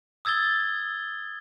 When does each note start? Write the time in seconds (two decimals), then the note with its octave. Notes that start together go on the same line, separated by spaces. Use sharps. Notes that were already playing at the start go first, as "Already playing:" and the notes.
0.25 D#6 E6 G#6 A6 G7